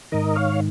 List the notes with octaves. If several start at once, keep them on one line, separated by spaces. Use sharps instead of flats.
G#2 D#3 A#4 D#5
C#5 F5